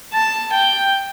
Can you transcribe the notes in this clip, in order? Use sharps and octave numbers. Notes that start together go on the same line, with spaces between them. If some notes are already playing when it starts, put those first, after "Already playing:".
A5
G5